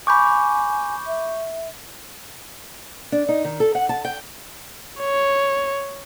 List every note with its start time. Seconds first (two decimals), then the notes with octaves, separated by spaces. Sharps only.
0.07 G#5 B5 C#6 D6 G6
1.07 E5
3.12 D4
3.29 D#4
3.44 D#3
3.60 A4
3.75 F#5
3.89 A5
4.05 G5
5.00 C#5